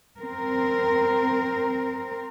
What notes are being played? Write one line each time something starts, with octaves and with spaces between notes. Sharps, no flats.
C4 A#4